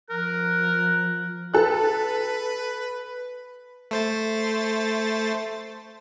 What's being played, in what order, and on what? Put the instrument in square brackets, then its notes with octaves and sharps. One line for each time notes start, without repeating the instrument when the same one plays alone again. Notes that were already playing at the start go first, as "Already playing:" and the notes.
[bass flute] F3 [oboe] A#4 [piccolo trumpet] F#6
[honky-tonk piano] A4 F#6 [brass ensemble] B4
[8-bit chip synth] A3 C5 A6